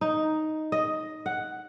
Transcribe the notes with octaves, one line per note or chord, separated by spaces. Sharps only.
D#4
D#5
F#5